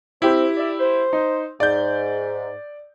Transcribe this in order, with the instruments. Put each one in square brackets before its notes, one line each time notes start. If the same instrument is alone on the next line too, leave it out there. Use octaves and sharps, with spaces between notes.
[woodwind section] C4 [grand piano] E4 G4
[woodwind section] D5 E5
C5
[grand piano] D#4
[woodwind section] G#2 [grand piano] D5 G6